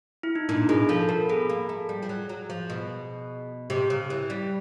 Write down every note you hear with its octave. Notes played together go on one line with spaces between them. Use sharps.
E4
D#4
A#2 D4
B2 G#4
F3 A4
B3 A#4
B3 G#4
A#3
A3
G3
F3
F#3
F#3
F3
B2
C3 G4
C#3
E3
G3